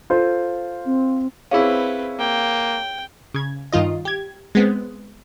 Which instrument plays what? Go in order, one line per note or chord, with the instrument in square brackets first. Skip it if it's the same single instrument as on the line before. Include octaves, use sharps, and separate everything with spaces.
[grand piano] F4 A4 C5
[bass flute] C4
[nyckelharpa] C4 B4 [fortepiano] C#4 E4 [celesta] G#4 F5
[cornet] A#3 [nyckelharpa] G5
[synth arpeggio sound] C#3 G#6
G2 D#3 F4 D#5
G4 G#6
G#3 B3 C4